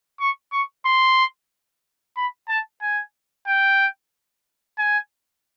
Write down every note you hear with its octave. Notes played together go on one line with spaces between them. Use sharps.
C#6
C#6
C6
B5
A5
G#5
G5
G#5